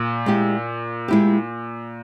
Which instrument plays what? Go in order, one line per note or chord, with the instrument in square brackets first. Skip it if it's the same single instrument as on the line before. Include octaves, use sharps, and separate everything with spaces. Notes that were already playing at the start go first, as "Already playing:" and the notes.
Already playing: [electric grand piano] A#2
[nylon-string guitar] G#3 E4 G4
G#3 E4 G4